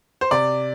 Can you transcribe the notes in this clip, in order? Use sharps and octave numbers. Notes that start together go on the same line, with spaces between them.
C5
C3 D5